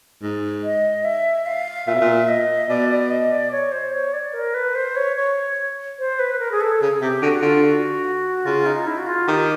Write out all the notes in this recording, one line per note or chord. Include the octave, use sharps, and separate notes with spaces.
G#2
D#5
E5
F5
A#2 E5
B2
A#2
D#5
B2 D5
D5
D#5
D5
C#5
C5
C#5
D5
A#4
B4
C5
C#5
C#5
C5
B4
A#4
G#4
A4
C#3 G#4
C3 G4
D3 F#4
D3 F4
F#4
C#3 F4
D#4
E4
F#4
F4
D#3 G4